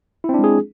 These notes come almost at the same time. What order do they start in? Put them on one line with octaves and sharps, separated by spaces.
E4 C4 D4 G#3 G#4